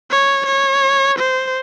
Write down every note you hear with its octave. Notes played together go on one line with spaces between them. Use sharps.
C#5
C#5
C5